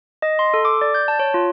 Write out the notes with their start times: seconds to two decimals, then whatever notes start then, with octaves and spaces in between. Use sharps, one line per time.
0.22 D#5
0.39 C6
0.54 A4
0.65 D6
0.81 D5
0.95 G6
1.08 A5
1.19 C#5
1.34 F4